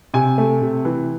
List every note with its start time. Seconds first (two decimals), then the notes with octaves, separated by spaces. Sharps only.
0.14 C3 G#5
0.38 A3
0.61 C3
0.85 E3